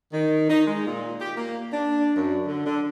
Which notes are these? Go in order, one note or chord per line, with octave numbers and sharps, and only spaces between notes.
D#3
D#4
G#3
A#2
G4
A#3
D4
F#2
D3
D3